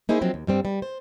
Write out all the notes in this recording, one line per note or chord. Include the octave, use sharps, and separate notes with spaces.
A#3 D#4 E4 G#4 C5
F3 F#3 C4
D#2
G2 G3 C4
G3
C5